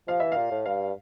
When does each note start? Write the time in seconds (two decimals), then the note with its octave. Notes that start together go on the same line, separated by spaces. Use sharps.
0.08 F3 F5
0.20 E3 E5
0.32 F5
0.37 A#2
0.51 A2
0.66 G2 F5